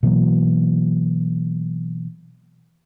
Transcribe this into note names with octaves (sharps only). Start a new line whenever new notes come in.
B2 E3 F#3 A#3